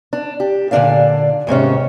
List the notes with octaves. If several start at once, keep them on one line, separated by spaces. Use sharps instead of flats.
D4
G4
A#2 D3 F#3 D4 D5 F5
D#2 G#2 C3 C#4